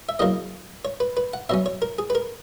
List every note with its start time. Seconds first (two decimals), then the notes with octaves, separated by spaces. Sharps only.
0.09 E5
0.19 E2 C#3 F#3 A#3 D#5
0.85 C#5
1.00 B4
1.17 B4
1.33 F#5
1.49 B2 F#3 C#4 E5
1.66 C#5
1.82 A#4
1.98 G#4
2.10 B4
2.15 A#4